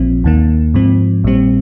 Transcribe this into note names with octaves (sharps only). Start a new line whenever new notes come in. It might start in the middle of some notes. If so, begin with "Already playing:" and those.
Already playing: A#1 A#2 F3 C4
D#2 D#3 A#3
G#2 F3 C4
A#1 A#2 G3 C4